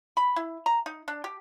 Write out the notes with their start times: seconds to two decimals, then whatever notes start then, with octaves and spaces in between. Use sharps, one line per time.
0.17 B5
0.36 E4
0.66 A#5
0.86 D#4
1.08 D4
1.24 G4